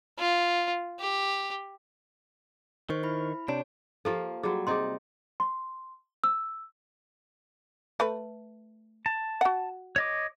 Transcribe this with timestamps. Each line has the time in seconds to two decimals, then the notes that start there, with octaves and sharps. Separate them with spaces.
0.19 F4
1.00 G4
2.90 D#3 C5 C#6
3.03 E4 B5
3.48 C3 D4 C#5
4.05 F3 A#3 F4 G4 A4
4.43 F#3 G3 F#4 G#4
4.67 C3 D#4 G#4 D5 C6
5.40 C6
6.24 E6
8.00 A3 B4
9.06 A5
9.41 F#4 F#5
9.96 C#5 D#5 D6